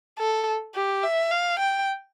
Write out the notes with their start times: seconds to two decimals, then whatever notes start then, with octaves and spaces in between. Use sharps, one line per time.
0.18 A4
0.75 G4
1.03 E5
1.31 F5
1.59 G5